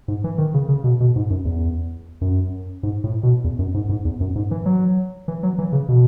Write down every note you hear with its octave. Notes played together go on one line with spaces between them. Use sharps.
G#2
E3
D#3
C#3
C#3
B2
B2
G#2
F#2
E2
F#2
G#2
A2
B2
E2
F#2
G#2
G#2
E2
F#2
G#2
E3
F#3
E3
F#3
E3
C#3
B2